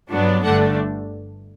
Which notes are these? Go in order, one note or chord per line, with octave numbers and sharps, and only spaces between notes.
G2 F#3 B3 D4
G1 G2 D3 A3 D4 F#5